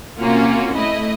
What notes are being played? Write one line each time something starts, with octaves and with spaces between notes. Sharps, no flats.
C3 A#3 C#4 F4 F#4
A3 E4 D#5